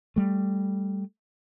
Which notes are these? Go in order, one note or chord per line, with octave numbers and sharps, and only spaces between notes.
G3 A3